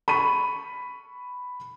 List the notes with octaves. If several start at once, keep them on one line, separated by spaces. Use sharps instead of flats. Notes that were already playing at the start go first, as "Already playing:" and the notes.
B5 C#6 D#7